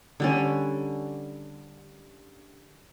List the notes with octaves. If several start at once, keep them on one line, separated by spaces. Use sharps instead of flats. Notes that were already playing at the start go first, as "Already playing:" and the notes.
D3 G3 C#4